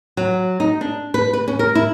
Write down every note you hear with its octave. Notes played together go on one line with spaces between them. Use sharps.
F#3
D#4
D4
B4
B4
C#4
A#4
E4